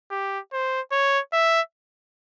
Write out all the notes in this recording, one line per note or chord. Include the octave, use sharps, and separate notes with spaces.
G4
C5
C#5
E5